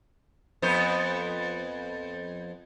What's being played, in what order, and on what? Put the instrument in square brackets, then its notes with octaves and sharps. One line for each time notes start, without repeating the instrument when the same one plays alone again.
[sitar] F2 B3 C5